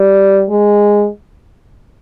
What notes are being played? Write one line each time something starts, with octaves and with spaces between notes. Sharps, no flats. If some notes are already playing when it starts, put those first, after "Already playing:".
Already playing: G3
G#3